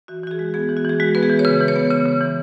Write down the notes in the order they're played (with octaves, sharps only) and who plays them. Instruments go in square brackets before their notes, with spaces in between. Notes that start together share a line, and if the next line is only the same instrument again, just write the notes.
[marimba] E3 F#4
E3 F#4
G#4
G#3
B3 G#4
E3
F#4
E3 G#4
G#3 F#4
B3 B4
G#4
E3
C#5
C#3 B4
E3
C#5
B3
C#3 C#5
C#3
E3